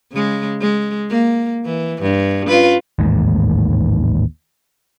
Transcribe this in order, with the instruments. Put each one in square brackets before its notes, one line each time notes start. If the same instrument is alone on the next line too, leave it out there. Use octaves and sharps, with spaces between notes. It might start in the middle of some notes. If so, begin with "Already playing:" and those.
[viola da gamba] C#3 G#3
G#3
A#3
E3
G2
C#4 F4 B4
[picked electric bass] A1 D#2 G#2